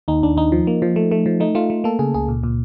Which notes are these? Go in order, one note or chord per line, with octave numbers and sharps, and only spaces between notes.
D#2 D#4
D#2 D4
D#2 D#4
F3
A#3
F3
A3
A3
F3
A3 D#4
A3 F4
A3
A#3 A4
C#3 G#4
C#2 G#4
A#2
A#2